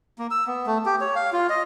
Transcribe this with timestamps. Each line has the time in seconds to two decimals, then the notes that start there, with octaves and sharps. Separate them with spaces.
0.19 A#3
0.31 E6
0.47 B3
0.66 A3
0.86 G4
1.01 C#5
1.15 F5
1.33 F4
1.50 D#5